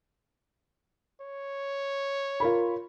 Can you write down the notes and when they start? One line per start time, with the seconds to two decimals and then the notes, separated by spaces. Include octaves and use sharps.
1.21 C#5
2.40 F4 A#4 B5